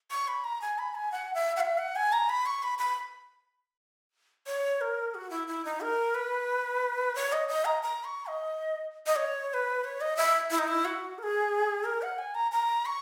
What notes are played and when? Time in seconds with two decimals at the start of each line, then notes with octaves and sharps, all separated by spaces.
0.11 C#6
0.28 B5
0.44 A#5
0.61 G#5
0.78 B5
0.95 G#5
1.12 F#5
1.34 E5
1.56 F#5
1.60 E5
1.78 F#5
1.96 G#5
2.12 A#5
2.29 B5
2.46 C#6
2.63 B5
2.78 B5
4.47 C#5
4.81 A#4
5.14 F#4
5.30 E4
5.47 E4
5.65 D#4
5.81 A#4
6.15 B4
7.15 C#5
7.33 D#5
7.48 D#5
7.65 A#5
7.82 A#5
8.04 C#6
8.26 D#5
9.06 D#5
9.16 C#5
9.49 C#5
9.54 B4
9.84 C#5
10.01 D#5
10.16 E5
10.51 E4
10.59 D#4
10.67 E4
10.85 F#4
11.18 A#4
11.23 G#4
11.84 A#4
12.02 F#5
12.18 G#5
12.35 A#5
12.51 A#5
12.86 C#6